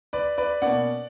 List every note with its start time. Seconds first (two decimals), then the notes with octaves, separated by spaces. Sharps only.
0.13 B4 D5
0.38 B4 D5
0.62 B2 A#3 C#4 D5 F#5